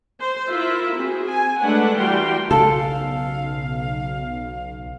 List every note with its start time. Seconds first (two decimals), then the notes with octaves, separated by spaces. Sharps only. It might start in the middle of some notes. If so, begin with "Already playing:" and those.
0.20 C5
0.51 E4 F4 A#4 E5
0.95 C4 F#4 G#4
1.30 G#5
1.63 G#3 A3 D4 B4 F#5
1.99 E3 G3 F#4 A#4 G5 C6
2.51 B1 C#3 A4 F5